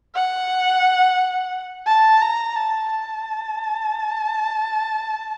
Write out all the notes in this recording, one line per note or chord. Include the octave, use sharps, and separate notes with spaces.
F#5
A5
A#5
A5
A5